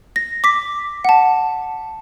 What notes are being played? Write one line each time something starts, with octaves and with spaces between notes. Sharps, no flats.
A#6
D6 B6
F#5 A5